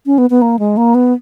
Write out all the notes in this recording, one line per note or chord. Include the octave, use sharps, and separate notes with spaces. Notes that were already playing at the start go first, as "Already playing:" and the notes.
C#4
B3
B3
A#3
G#3
A#3
B3